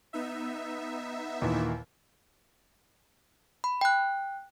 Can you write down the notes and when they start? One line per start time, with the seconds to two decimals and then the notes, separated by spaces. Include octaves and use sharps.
0.13 B3 D#4 E5
1.42 D#2 A#2 E3
3.64 B5
3.81 G5 F#6